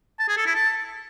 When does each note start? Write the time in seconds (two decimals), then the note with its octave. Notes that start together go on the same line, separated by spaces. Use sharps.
0.19 A5
0.28 G#4
0.37 A4
0.46 E4
0.55 A5